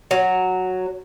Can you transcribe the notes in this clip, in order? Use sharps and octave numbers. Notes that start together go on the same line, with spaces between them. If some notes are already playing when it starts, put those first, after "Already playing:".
F#3